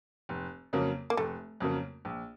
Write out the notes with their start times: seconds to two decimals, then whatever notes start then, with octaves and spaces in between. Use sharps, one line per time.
0.29 F1
0.73 F2 C#3 F#3 A#3
1.10 A#3
1.17 F1 A3
1.60 F2 C#3 F#3 A#3
2.05 A#1